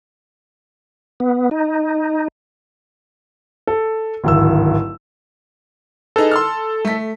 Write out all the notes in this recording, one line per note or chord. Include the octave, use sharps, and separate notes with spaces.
B3
D#4
A4
D1 G#1 E6
D#4 G#4 A4 B4
C6 E6 F6
A3 B6